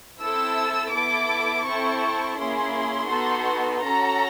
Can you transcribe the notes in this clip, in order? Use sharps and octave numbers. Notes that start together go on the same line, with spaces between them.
C4 E4 A4 E6
B3 E4 A4 D6
C4 E4 A4 C#6
A#3 C#4 E4 G#4 C6
B3 D#4 F#4 A4
C#4 F#4 A4 A#5